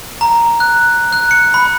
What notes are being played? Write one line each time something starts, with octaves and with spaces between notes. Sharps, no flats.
A#5
F#6
F#6
C#7
B5